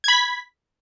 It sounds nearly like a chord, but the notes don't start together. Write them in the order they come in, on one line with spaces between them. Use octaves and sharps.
G#6 B5 B6